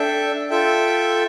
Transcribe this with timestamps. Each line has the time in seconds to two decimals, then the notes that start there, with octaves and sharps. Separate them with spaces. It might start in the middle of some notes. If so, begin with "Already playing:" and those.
Already playing: D4 A4 E5 G5
0.50 F4 A4 E5 G5